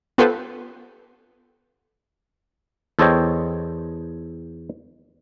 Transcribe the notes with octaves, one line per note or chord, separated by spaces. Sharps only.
B3 F4 G4 A4 B4 C5
E2 A4 C5 C#5 D#5 G5